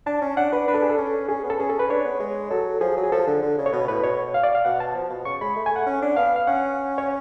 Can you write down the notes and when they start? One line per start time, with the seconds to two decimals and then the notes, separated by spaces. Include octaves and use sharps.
0.06 D4 A5
0.22 C#4
0.37 D4 F#5
0.52 D4 B4
0.68 D4 B4
0.74 A4
0.82 G#4
0.90 A4
0.98 C#4
1.28 C#4 G#4
1.43 B3
1.50 A4
1.59 C#4 G#4
1.69 A4
1.79 B4
1.89 D4 C#5
2.05 B3
2.20 G#3
2.51 F#3 A4
2.81 F3 G#4
2.97 F#3
3.04 G#4
3.12 F3 A4
3.27 D3
3.42 D3
3.58 C#3
3.66 C#5
3.73 B2 B4
3.88 A2 B4
4.03 B2 C#5
4.34 F5
4.44 D5
4.55 F5
4.65 B2 F#5
4.80 A5
4.95 F3
5.10 B2
5.25 C#3 C#6
5.41 G#3 B5
5.56 A3
5.66 G#5
5.72 A3 F#5
5.86 C#4
6.02 D4
6.17 B3 F5
6.36 F5
6.47 C#4 F#5
6.98 C#5